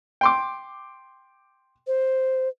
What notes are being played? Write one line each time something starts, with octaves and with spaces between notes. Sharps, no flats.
G5 C6 D6
C5